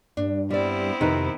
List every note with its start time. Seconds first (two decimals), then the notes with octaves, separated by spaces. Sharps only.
0.17 G2 D4
0.51 G3 B3 C4 E4 D5
1.01 F2 C3 D#3 B4